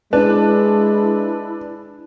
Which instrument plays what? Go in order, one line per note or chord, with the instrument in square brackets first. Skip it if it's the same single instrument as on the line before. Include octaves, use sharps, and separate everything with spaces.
[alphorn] G#3 [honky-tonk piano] D4 [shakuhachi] E4 [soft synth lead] B4